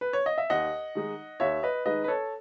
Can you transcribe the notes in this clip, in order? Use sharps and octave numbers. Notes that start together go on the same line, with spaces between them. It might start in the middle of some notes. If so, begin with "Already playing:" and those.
B4
C#5
D#5
E5
D#2 D#5 F#5
D#3 G#3 D#4
D#2 C#5 E5
B4 D#5
D#3 G#3 D#4 B4 D#5
B4
A4 C#5